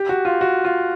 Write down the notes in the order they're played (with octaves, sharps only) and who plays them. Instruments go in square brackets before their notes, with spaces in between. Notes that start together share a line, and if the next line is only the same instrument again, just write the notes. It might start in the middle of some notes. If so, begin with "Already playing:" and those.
Already playing: [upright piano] G4
F#4
F4
F#4
F4